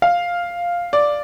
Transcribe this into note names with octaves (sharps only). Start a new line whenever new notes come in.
F5
D5